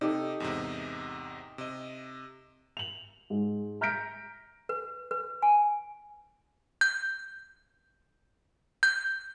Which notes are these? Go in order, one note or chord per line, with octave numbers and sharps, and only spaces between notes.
C3 D#4 G4 A4
E2 G#2 C3
C3 D#5
F7 F#7
G#2
A#5 F6 G6 A#6 B6 D7
B4
B4
G#5
G6
G6